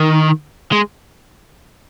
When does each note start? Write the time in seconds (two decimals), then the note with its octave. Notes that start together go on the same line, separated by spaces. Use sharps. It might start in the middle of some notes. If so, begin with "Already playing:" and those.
Already playing: D#3
0.72 G#3